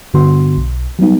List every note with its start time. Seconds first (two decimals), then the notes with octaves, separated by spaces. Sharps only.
0.14 G2 D3 B3 F#4 C6
0.57 B1
0.99 F#3 G3 B3 D#4